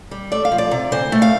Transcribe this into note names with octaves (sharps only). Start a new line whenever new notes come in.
G3
A3 D5
F5
F3
D5
C3
D2 C5
A3
F5